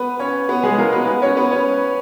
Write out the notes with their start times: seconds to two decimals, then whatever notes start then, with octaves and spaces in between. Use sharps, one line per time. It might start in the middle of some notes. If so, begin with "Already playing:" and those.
Already playing: B3 B4
0.19 C#4 C#5
0.49 B3 B4
0.63 G#3 G#4
0.78 A#3 A#4
0.92 B3 B4
1.07 B3 B4
1.22 C#4 C#5
1.37 B3 B4
1.51 C#4 C#5